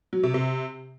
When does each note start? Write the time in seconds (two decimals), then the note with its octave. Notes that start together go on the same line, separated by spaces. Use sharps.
0.13 F#3
0.23 C3
0.34 C3